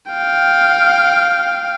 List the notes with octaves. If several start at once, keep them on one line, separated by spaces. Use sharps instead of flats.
F5 G5